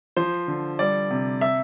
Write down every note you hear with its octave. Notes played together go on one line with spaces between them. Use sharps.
F3 C5
D3
G3 D5
C3
E5